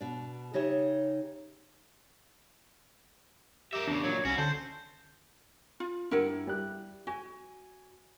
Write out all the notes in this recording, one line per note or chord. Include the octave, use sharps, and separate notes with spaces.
B2 D4
C#3 D#4 G4 C#5 E5
G4 A#4 E5
E2 C#3 D4
A#2 F#3 C#5
C2 C#4 E4 F#4
D3 C5 A5
F4
G2 G3 E4 A#4 F#5
G3 F#6
F#4 G#5